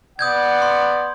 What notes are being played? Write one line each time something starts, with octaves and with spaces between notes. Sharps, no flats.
B3 D5 F#5 D#6 G6 G#6
C6